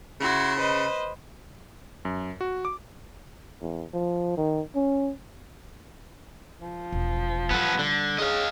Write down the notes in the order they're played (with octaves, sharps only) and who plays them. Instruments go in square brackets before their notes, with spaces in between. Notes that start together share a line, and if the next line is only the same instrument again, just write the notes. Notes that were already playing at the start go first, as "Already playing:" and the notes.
[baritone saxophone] C#3 [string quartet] E4 F#4 C6
[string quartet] B4 C5 D#5
[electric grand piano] F#2
F#4
D6
[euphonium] E2
F3
D#3
C#4
[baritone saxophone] F3
[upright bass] E1
[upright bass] G3 [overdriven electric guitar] B3 A4
[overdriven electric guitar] D3
[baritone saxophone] C#3 [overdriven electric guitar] D#5 F5